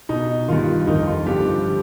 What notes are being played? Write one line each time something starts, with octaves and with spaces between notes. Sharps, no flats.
B2 D#4
G2 D#3 F4
F2 D#3 D#4
F4
G2 D3 F3 G4
F3